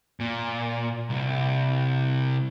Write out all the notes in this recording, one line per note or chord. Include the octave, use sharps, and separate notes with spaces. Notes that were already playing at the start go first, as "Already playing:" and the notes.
A#2
C2